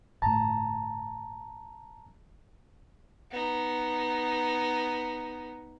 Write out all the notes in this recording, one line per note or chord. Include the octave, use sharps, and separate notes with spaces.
G1 A2 A5 A#5
B3 D#4